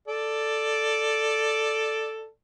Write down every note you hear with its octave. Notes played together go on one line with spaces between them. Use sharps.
A4 D5